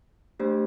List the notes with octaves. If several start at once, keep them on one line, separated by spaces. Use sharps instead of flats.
A3 D4 G4 C5